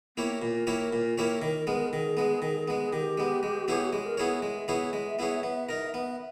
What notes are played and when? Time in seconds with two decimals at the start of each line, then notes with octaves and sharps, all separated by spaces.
0.17 A#3 B3 E4 G4 C#5
0.42 A#2 A#4
0.67 A#3 E4 G4 C#5
0.93 A#2
1.18 A#3 E4 G4 C#5
1.42 D#3
1.67 G#3 B3
1.92 D#3 G#4
2.17 G#3 B3
2.42 D#3
2.68 G#3 B3
2.86 G#4
2.93 D#3 G4
3.18 G#3 B3
3.43 G#3
3.68 B3 E4 G#4 C#5
3.93 G#3 G#4
4.05 A#4
4.17 B3 E4 G#4 C#5
4.43 G#3 E5
4.68 B3 E4 G#4 C#5
4.93 G#3
5.19 B3 E4 G#4 C#5
5.43 B3
5.69 D#4 A#4
5.94 B3